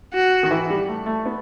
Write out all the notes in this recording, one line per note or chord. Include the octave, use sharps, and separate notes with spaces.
F#4
D#3
E3
G3
A3
A3
B3